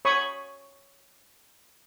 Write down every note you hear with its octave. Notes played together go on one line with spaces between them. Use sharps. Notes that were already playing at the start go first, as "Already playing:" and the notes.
C#5 B5 C#6 D#6